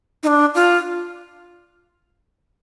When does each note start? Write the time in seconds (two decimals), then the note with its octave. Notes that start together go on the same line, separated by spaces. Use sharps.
0.23 D#4
0.27 D4
0.55 F4